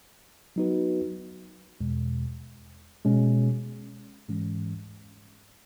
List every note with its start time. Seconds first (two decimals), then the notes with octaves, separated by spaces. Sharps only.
0.56 F#3 B3 D#4 F#4 B4
1.80 E2 B2 G#3
3.05 B2 G#3 C#4
4.29 G#2 E3 G#3 C#4